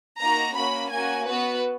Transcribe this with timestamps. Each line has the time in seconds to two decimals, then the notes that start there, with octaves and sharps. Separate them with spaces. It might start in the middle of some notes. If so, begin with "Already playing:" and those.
0.21 A#3 D#4 F#4 A#5
0.56 A#3 C#4 F#4 B5
0.91 A#3 C#4 F#4 G#5
1.27 B3 F#4 B4